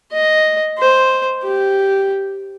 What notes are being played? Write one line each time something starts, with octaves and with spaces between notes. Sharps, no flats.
D#5
C5
G4